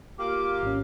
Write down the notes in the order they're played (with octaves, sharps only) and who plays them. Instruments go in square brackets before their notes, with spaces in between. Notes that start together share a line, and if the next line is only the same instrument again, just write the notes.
[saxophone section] A#3 F4 G4 [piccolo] D6
[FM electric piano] G#1 C#4